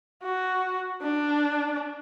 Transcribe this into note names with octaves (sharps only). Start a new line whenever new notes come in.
F#4
D4